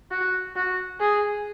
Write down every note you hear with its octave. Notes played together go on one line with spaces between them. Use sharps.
F#4
F#4
G#4